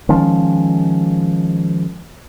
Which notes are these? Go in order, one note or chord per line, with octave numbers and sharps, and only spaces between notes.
D#3 F3 G#3 C#4